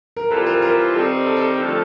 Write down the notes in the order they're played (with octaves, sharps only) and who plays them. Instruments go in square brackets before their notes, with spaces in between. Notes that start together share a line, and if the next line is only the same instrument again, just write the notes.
[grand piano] A#4
[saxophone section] E3 G3 C4 F4 [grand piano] A4
[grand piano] A#4
A#4
[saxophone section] D#3 G3 C4 D#4 [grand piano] A4
[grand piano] A4
A4
[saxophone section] F2 D3 F3 A3